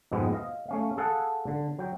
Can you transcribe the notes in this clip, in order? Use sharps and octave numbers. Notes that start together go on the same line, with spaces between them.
F2 G#2 B2 G#3 B3 C4
D#5 F5
A3 C#4 F5
G#4 A4 F5 F#5 G#5
D3
F#3 G5